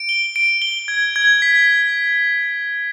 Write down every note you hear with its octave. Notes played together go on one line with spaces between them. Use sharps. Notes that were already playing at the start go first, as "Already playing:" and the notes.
Already playing: D7
G7
D7
G7
G#6
G#6
B6